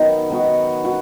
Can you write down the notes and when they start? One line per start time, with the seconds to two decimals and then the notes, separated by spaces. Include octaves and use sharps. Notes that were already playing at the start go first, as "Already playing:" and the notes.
Already playing: D#3 F#3 B3 D#4 F#4
0.30 D#3 B3 F#4
0.85 F#4